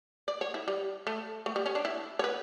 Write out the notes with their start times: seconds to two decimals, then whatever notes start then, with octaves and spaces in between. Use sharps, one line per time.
0.28 D5
0.41 C#5
0.54 E4
0.68 G3
1.07 A3
1.46 A3
1.56 G3
1.66 C#4
1.75 D4
1.85 E4
2.19 C#5
2.24 B4